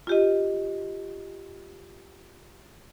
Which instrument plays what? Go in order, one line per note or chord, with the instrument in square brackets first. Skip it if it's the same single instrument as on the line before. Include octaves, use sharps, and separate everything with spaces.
[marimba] F4 G4 D#5